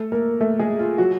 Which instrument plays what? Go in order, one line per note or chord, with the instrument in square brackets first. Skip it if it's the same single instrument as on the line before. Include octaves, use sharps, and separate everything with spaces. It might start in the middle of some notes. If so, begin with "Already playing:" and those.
Already playing: [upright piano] A3 A4
A#3 A#4
A3 A4
G#3 G#4
F4
F#3 F#4